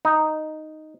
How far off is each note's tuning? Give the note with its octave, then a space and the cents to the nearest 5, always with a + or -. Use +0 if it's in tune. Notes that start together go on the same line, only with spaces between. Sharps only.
D#4 +0